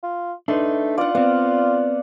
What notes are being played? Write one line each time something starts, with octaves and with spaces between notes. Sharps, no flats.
F4
A3 D4 D#4 B4 C6
F4 D5 F#5
B3 C4 D5 F5 F#5